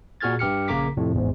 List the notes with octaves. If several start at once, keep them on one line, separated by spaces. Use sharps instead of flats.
A#2 F#4 G#4 F6 G#6 A6
G2 G4 F6 C#7
A#1 C#3 A#3 A#5 D6 B6
F2 A2 C3
A1 E2 G#2